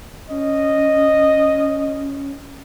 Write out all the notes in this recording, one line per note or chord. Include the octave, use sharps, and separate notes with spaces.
C#4 D#5